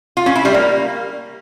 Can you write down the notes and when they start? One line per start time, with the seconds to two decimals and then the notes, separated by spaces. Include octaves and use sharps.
0.17 F4
0.26 C#4
0.36 E4
0.45 G3
0.54 A#3